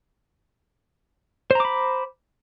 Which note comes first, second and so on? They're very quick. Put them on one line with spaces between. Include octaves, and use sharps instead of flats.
C5 A#5 D6 B5